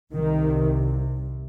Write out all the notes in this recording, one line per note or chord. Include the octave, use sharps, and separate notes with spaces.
C2 C3 D#3